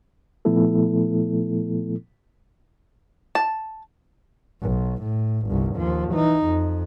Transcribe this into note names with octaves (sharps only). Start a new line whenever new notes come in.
A#2 F3 A3 B3 E4 A4
A5
B1
A2
G1 C2
D#2 F3
E3 D#4
F2